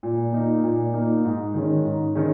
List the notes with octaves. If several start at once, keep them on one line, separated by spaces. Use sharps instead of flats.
A#2
A#3 D#4
A#2
A#3 D#4
G#2
D#3 G#3 C#4
G#2
D#3 G#3 C#4